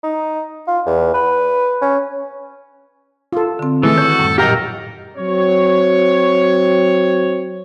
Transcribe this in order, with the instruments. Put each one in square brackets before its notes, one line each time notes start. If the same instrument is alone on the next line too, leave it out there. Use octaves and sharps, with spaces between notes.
[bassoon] D#4
F4
E2
B4
C#4
[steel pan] F4 A4
[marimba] D3 C4
[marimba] D#3 [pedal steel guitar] E3 A3 [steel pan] E4 G#4 [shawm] A4
[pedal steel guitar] F#4 G6 [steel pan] C#5
[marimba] F#2 A2 G3
[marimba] A#2 F#3 [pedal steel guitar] G4 D#5 [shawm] A#4 [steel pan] F5 G5 A#5
[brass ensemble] F#3 C4 C#5